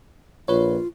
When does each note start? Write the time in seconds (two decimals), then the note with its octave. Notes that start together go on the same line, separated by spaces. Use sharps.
0.48 A#1 F4 B4 C#5